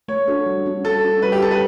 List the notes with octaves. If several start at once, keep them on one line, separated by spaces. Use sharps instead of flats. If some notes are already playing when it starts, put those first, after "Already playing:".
A3 C#5
D4 F#4 A4
G3
C#4 F#4
G3 A4
C#4 F#4
G3 B4
G4
C#4 F#4 A4
B4